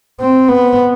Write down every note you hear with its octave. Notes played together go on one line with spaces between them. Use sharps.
C4
B3